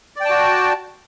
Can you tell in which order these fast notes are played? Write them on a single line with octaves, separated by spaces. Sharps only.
D5 G5 A5 F#4